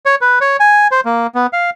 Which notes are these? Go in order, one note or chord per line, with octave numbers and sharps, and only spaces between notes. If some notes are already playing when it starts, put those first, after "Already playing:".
C#5
B4
C#5
G#5
C5
A#3
B3
F5